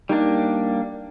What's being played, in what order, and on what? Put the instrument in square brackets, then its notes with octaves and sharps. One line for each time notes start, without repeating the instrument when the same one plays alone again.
[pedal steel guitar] G3 A#3 D4 [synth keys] D#4